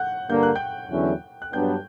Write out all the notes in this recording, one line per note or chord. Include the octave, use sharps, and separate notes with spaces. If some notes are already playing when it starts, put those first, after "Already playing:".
Already playing: F#5 F#6 G6
G2 D3 A#3 G6
F#6
G5 G6
E2 D3 F#3 C#4 E4
F#6
G2 F#3 B3 D4 G5 G6